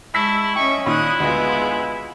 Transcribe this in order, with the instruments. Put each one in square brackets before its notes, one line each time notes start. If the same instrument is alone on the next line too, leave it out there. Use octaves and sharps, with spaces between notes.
[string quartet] G#3 A5 C#6 [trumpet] E4 [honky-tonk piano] E6 B6
[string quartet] C#4 D#5 E5 [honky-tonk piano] G5 [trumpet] C#6
[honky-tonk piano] A#2 D#3 [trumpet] E4 [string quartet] D#6 F#6
[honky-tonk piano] D2 D#5 [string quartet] G#3 B3 F4